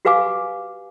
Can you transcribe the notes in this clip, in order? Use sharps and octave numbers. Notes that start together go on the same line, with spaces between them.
F#4 G4 B4 F5 G#5 D6